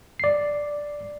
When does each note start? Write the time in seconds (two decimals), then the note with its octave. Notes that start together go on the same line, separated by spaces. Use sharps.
0.20 D5 C7